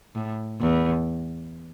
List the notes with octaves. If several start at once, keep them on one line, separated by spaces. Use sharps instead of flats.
A2
E2